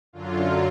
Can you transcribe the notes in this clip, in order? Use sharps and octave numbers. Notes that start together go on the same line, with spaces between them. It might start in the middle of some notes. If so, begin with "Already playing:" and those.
F#2 D3 F#3 F4